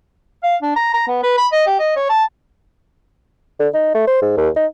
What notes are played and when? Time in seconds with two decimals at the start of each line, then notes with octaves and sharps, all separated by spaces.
0.43 F5
0.62 D4
0.76 A#5
0.94 A#5
1.08 B3
1.24 B4
1.38 B5
1.53 D#5
1.67 G4
1.79 D#5
1.96 C#5
2.10 A5
3.60 D3
3.74 D#4
3.95 A3
4.07 C5
4.22 G#2
4.37 D#2
4.56 D#4